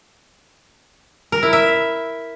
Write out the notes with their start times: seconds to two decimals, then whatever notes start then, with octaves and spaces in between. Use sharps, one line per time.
1.32 A#4
1.43 E4
1.53 E5